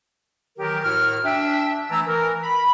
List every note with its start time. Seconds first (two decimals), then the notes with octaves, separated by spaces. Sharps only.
0.58 D#3 E3 F#3 G4 A#4
0.83 A2 F#4 A#4 F6
1.25 D4 E5 G5
1.90 E3 A3 A5 A#5 E6
2.07 E3 A#4
2.43 B5